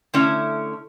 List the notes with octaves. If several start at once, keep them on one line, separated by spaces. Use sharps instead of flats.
D3 A3 C#4 E4